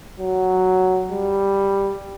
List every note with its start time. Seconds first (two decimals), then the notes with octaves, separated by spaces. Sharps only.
0.20 F#3
1.12 G3